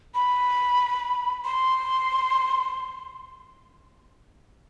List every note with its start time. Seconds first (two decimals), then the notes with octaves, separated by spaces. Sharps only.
0.15 B5
1.45 C6